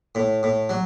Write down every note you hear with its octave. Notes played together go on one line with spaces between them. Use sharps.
A2
A2
F#3